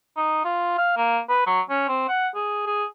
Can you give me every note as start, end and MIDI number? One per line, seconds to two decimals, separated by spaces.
0.17 0.44 63
0.45 0.75 65
0.78 0.96 77
0.97 1.20 58
1.29 1.47 71
1.47 1.61 54
1.70 1.86 61
1.89 2.07 60
2.09 2.28 78
2.35 2.65 68
2.67 2.85 68